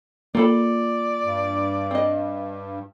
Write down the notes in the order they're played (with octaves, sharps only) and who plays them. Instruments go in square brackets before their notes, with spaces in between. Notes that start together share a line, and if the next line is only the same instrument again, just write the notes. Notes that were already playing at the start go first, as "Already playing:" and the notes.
[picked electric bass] A#3 [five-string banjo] F4 A4 B5 [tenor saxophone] D5
[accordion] G2
[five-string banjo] C4 D#5